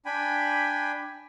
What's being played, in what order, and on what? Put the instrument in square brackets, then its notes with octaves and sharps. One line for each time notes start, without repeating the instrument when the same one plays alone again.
[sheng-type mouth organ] D4 G5 G#5 B5